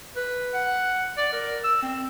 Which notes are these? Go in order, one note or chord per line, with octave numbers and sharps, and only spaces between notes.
B4
F#5
D5
A#4
E6
C4